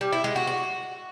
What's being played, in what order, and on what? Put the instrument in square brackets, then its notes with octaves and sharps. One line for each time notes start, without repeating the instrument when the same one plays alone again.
[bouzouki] G3
E4
G#3
F#4
F#4